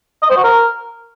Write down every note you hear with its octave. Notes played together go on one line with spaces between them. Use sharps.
D#5
C5
F#4
A#4